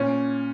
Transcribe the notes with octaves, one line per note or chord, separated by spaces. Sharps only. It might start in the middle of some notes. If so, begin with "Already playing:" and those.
Already playing: A#2 C#4